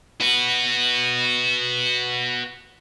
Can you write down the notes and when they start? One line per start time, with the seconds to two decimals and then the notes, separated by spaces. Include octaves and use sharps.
0.21 F#4 B4